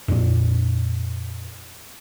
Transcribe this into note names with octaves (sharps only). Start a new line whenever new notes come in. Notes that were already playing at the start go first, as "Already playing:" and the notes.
F2 A#2 D4